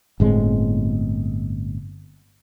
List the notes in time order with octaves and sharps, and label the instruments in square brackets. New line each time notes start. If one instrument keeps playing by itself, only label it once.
[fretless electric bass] G1 A2 G#3 C4